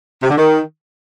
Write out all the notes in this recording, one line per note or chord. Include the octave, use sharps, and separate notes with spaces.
C3
D3
D#3